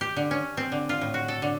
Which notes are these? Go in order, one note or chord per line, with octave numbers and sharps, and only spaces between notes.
G4
D3
C#4
C4
D3
F4
A2
F#4
A4
D3